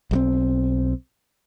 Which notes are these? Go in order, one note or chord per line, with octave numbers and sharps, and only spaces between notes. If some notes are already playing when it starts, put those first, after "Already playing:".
B1 G3 C4